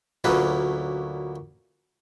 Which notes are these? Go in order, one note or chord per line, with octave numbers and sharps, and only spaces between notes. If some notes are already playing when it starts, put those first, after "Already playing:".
D2 A#2 F#3 C#4 B4